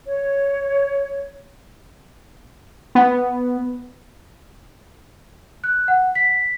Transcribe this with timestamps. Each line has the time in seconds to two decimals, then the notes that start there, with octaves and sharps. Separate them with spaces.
0.05 C#5
2.95 B3
5.64 F#6
5.88 F#5
6.15 B6